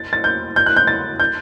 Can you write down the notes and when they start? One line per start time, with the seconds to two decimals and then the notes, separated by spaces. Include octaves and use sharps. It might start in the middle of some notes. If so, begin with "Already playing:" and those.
Already playing: A6
0.13 A6
0.24 G6
0.56 G6
0.66 F#6
0.77 G6
0.87 A6
1.20 G6